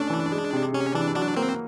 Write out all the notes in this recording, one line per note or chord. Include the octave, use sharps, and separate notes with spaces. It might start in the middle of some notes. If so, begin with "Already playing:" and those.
Already playing: A3 C#4 D4
E3
G#3
C3
C3 C#4
E3 D4
F#3 D4
A#3 C4